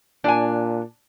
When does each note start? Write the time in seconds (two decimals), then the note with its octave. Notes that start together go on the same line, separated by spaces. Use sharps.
0.24 A#2 D4 D5 G#5 A5